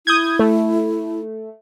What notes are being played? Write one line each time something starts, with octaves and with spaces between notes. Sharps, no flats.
E4 D#6 G6 G#6
A3